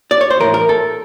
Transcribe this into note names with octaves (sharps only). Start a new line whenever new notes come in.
D5
C#5
C5
A2 E3 A#4
A#4
A4